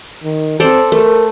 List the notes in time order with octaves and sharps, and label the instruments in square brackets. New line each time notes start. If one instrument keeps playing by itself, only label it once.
[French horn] D#3
[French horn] C4 [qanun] A4 C5 D5
[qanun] A3 [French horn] A#4